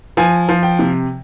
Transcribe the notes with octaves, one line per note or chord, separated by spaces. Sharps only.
F3 G#5
F3
G5
C3